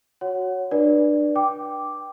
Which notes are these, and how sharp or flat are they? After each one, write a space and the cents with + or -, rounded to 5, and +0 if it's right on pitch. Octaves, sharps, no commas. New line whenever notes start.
F#4 +0 C#5 +0 F#5 +0
D4 +25 B4 -30 D5 +0
G5 -5 D6 +0